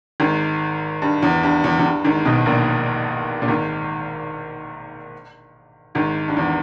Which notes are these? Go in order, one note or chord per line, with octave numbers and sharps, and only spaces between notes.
G#1 G#2
G2
E2
G2
E2
E2
G2
G#1 G#2
B1 B2
A#1 A#2
A#2
G#1 G#2
G#1 G#2
G2
E2